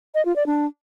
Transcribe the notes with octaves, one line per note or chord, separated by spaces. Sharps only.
D#5
F4
D5
D4